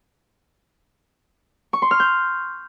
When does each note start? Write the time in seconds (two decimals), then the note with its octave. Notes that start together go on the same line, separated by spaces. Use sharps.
1.73 C#6
1.82 C6
1.91 F6
2.00 G6